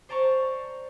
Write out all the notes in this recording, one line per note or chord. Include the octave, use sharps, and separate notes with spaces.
C5 D5 A5 A#5 C#6